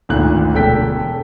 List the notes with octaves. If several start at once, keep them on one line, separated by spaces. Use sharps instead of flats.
G#1 D2 A#2 F#6
E1 A4 G5 B6